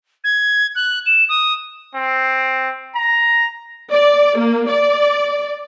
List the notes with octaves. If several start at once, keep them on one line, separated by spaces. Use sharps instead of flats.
G#6
F#6
E7
D#6
C4
A#5
D5
A#3
D5